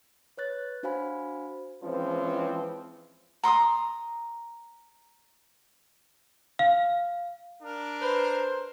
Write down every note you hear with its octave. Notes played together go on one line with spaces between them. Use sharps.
B4 C#5 F#6 A6
D4 F#4 C5 F5 G#5 B5
E3 F3 G#3 C4 C#4 B4
A#5 C6 D6 D#6
F5
D4 A#4
B4 C5 B5